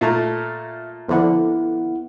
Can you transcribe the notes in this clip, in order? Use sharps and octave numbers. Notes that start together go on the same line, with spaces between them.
A#2 A3 E5 A#5
F2 D3 B3 E4 F#5